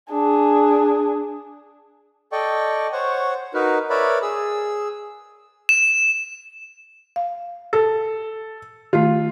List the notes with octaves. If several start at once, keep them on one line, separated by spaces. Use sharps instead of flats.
D4 G#4
A4 D5 D#5 G5 C#6
C5 C#5 F#5 C#6
D#4 F#4 A#4 B4
A#4 B4 C#5 D5 E5 B5
G#4 E6
E7
F5
A4
D#3 A3 F4